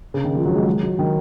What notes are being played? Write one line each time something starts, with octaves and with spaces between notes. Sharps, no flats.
C#3
D#3
F3
F#3
G#3
G#3
F#3
D#3